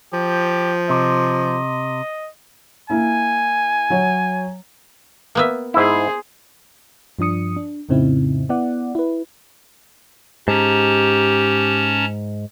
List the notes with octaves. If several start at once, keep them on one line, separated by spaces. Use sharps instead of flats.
F3 G4
C3 D#5
A#3 E4 G#5
F#3 C#5
A#3 B3 E5
G#2 E4 G#4 C5
G2 F3 D4 D#6 C#7
D4
F2 A2 C#3 C4 D#4 E4
B3 E4 D5 F#5
E4 B4
G#2 C#4 G4 A5 A#5